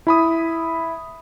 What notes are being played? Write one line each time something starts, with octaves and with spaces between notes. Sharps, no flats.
E4 B5 D#6